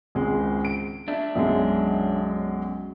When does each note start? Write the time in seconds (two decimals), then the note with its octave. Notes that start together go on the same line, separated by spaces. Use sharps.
0.15 G#1 C#2 G#3
0.65 D7
1.08 D4 E5
1.35 B1 F#2 G#3